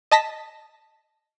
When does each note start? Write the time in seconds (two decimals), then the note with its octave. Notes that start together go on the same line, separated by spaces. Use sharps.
0.12 D#5 A5 A#6 B6